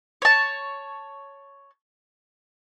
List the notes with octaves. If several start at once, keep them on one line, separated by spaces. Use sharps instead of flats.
C#5 A5